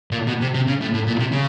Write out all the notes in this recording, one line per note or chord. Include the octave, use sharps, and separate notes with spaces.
A#2
B2
C3
C3
C#3
A2
A2
A#2
C3
C#3